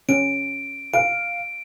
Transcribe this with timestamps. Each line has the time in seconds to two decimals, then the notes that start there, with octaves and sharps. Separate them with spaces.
0.09 C#4 D7
0.94 F5 D7